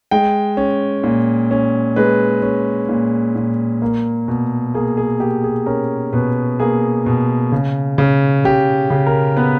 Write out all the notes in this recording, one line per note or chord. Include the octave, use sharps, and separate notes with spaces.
G#3 G5
C#4
A#2
C#4
G#3 B4
C#4
A#2
A#2
A#3
B2
A#3 G#4
G#4
A#3 G4
G#4
C#4 A#4
B2 B4
A#3 G#4
B2
C#3
C#3
C#3 G4
C#3
A#4
B3 B4